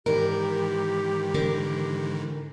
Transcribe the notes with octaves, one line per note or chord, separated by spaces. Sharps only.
G#2 D#3 E3 G4 A#4
D3 A#4